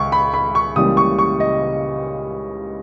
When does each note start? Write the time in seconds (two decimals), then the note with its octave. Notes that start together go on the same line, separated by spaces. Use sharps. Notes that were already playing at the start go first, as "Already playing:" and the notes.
Already playing: C#2 C#6
0.12 B5
0.34 B5
0.55 C#6
0.76 C#2 C#3 E3 G3 A#3 D#6
0.97 C#6
1.19 C#6
1.40 D#5